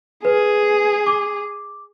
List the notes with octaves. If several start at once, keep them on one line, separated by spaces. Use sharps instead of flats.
G#4 B4
D6